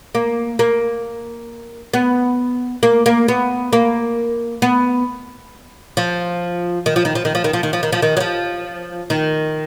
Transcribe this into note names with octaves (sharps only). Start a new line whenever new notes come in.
A#3
A#3
B3
A#3
A#3
B3
A#3
B3
F3
D#3
F3
D#3
F3
D#3
F3
D#3
F3
D#3
F3
D#3
F3
D#3
F#3
F3
D#3